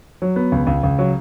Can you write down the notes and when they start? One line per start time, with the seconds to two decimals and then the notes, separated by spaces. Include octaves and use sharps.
0.22 F#3
0.36 B3
0.52 C#2
0.67 C#2
0.83 C#2
0.99 F#3